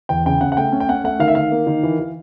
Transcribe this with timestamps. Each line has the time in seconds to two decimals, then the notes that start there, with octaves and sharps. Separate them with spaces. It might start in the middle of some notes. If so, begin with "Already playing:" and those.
0.09 E2 G5
0.26 C#3 G5
0.41 C#3 F#5
0.52 F#5
0.57 A3 G5
0.72 C#4
0.80 G5
0.89 C#4 F#5
1.04 A3 F#5
1.19 D#3 F5
1.28 E5
1.35 D#3 F5
1.52 A#3
1.67 D#3
1.83 E3
1.99 E3